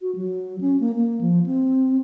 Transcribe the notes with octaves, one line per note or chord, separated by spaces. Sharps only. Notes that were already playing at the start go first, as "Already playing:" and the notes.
F#4
F#3
C#4
A#3
A#3
F3
C4